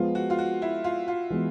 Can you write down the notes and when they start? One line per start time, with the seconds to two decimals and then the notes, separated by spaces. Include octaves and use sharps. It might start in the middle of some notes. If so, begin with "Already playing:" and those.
Already playing: F3 G#3 B3 F4
0.15 F#4
0.30 F4
0.38 F#4
0.62 E4
0.84 F4
1.08 F4
1.30 E3 G#3 B3